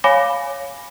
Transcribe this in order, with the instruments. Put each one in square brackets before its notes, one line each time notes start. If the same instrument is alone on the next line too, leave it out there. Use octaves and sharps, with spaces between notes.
[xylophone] C#5 F5 G#5 B5 D6 A#6